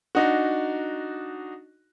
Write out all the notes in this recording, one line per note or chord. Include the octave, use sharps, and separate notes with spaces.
D4 D#4 F#4